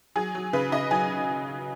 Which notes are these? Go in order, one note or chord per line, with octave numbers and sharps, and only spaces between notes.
F#3 G#4
F#3
C#3 B4
C#3 D#5
F#3 G#5